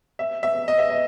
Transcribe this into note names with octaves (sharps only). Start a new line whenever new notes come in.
E5
E5
D#5
E5
D#5